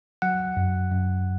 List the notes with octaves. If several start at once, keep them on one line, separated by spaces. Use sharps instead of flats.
F#3 F#5
F#2
F#2